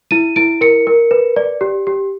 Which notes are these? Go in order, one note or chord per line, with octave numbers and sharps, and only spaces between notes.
E4 D#7
E4 D7
A#4 C#7
A#4
B4
D5
G4
G4